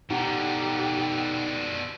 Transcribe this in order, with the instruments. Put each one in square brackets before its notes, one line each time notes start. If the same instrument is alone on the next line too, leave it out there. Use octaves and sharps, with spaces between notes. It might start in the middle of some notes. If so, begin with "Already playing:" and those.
[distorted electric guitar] B2 D3 [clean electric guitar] D#4 F#5 A#5 [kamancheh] G4